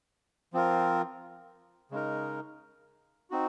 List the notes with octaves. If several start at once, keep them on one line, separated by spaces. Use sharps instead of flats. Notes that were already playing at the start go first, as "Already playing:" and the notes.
F3 C4 F4 A#4
C#3 G#3 D#4 A#4
C4 D#4 F#4